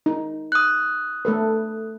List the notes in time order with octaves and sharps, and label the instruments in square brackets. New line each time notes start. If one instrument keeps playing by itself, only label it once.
[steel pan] D#4
[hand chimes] D#6 F#6
[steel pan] A3 A4 B4